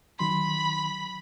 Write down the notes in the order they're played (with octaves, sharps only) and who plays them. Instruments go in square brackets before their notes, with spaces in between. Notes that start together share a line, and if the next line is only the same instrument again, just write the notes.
[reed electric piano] D#3 F#3 C6 [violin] B5